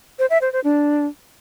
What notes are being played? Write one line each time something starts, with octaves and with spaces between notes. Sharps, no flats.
C5
E5
C5
C5
D4